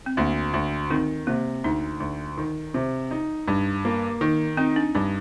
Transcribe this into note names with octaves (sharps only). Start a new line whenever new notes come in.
C4
D2 A#3
D2
D#3 C4
C3 A#3
D2 D#4
D2
D#3
C3
D#4
G2
A#3
D#3
C4 D#4
D4
G2 D4